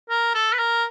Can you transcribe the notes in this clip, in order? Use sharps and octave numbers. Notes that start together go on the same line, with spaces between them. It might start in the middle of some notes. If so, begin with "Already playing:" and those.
A#4
A4
B4
A#4